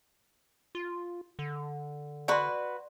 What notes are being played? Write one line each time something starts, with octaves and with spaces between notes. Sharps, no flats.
F4
D3
F#4 B4 D5 C6